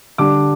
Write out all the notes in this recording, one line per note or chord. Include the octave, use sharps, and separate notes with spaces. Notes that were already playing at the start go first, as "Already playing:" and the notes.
D3 G3 D4 D6